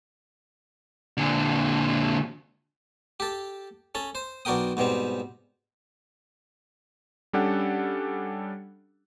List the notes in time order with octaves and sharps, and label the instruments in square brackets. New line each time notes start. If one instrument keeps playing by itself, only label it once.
[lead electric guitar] A#2 D3
[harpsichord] G4 A4
C#4 A4
C5
B1 D4 F#4 A#4 G5 D#6
G#2 B2 G3 C4
[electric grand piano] G3 C#4 D4 G4 A4 F#5